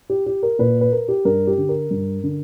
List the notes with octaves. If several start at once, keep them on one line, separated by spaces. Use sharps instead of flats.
G4
G4
A#4
A#2 B4
B4
A#4
G4
G2 A#4
G4
D3
A#4
G2
D3